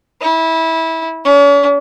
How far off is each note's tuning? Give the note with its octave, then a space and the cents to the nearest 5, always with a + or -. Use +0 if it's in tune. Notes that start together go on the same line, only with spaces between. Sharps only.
E4 -20
C#4 +40